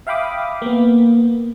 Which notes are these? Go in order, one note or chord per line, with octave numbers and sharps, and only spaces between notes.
E5 F5 G5 B5 D6 D#6
A#3 B3